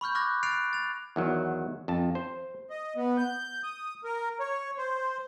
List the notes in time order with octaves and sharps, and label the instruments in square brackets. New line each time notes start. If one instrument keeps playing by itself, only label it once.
[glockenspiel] B5 C#6 F6 G6
C#6 D6 F6 F#6 G#6 A#6
F6 F#6 A6 C7 D7 F7
A6 F7
[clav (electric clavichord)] E2 D#3 F#3
F2 A5
C5
[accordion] D#5
B3
G6
D#6
A#4
C#5
C5